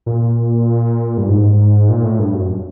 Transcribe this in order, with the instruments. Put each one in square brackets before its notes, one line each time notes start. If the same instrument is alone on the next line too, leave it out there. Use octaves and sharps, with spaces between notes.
[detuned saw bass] A#2
G2
G#2
A#2
A2
G2
F#2